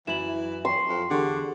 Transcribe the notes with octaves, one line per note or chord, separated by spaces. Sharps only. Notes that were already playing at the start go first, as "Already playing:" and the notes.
F#2 E3 E4 E7 F#7
G5 C6 C#6 C7
F2
E2 D3 G4 G#4 C#6